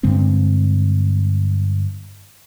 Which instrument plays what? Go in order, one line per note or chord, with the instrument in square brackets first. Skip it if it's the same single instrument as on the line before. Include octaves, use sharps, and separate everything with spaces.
[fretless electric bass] G2 D3 G#3 C4